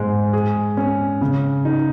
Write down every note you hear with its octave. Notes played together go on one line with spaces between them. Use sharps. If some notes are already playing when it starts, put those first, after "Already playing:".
Already playing: G#2 G#3
G#4
C#4
C#3
D#4